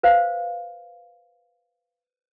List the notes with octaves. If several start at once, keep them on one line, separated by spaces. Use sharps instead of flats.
B4 C5 F5